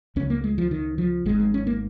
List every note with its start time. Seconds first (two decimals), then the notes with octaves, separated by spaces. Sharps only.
0.16 C#2 C#3 C#4
0.30 A#3
0.44 G#3
0.58 F3
0.71 D#3
0.98 F3
1.26 G#1 G#2 G#3
1.40 G#3
1.54 C#4
1.67 A#3